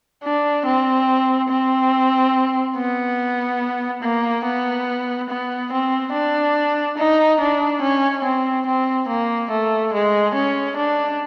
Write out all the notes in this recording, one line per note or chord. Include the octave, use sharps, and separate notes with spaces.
D4
C4
C4
B3
A#3
B3
B3
C4
D4
D#4
D4
C#4
C4
C4
A#3
A3
G#3
C#4
D4